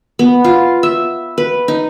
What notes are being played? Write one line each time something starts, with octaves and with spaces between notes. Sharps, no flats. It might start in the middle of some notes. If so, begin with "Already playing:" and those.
B3
F4
E5
B4
D#4